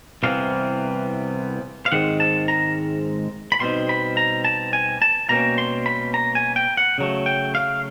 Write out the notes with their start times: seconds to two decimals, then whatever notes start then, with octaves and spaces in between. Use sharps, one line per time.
0.23 C2 C3 E3 G3 B3 F5
1.86 F5
1.92 G#2 D#3 G#3 C4 F#5
2.20 A5
2.48 A#5
3.52 B5
3.60 B2 G3 C4 D#4 C6
3.89 B5
4.17 A#5
4.45 A5
4.73 G#5
5.02 A5
5.29 B2 G3 A#3 C#4 A#5
5.58 C6
5.86 B5
6.14 A#5
6.35 G#5
6.56 G5
6.77 F#5
6.98 C#3 F#3 A3
7.26 G5
7.55 F5